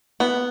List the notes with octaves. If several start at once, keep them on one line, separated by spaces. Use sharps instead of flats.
B3